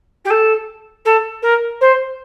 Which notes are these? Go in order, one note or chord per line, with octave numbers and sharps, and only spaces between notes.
G4
A4
A4
A#4
C5